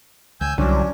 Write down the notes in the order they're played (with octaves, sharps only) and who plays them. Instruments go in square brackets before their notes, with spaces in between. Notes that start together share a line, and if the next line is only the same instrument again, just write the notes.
[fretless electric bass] C#2 [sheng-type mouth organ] G#5 E6 G6
[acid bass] C2 [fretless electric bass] D3 F#3 [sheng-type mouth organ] C#4 D4